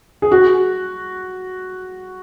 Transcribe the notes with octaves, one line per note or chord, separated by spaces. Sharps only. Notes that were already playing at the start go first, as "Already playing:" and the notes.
G#4
F#4